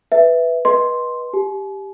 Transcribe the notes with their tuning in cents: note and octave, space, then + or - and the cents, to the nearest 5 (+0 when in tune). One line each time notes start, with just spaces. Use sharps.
B4 +0 E5 +0
B4 -25 D#5 +0 C6 +0
G4 +0 G#5 +40